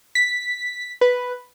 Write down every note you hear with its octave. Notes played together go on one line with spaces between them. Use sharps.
B6
B4